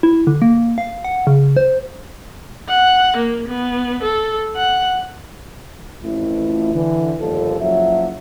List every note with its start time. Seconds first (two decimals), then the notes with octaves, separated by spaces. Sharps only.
0.03 E4
0.27 D3
0.42 A#3
0.78 F5
1.04 F#5
1.27 C#3
1.57 C5
2.69 F#5
3.17 A#3
3.48 B3
4.03 A4
4.56 F#5
6.03 A1 F2 A3 E4
6.74 D3 E3
7.19 G1 D#2 F3 A4
7.60 F#1 F3 F#3 E5